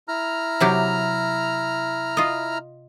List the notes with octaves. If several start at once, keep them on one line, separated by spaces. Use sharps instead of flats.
E4 A#5 F6
C3 F#3 G4
F4 D#5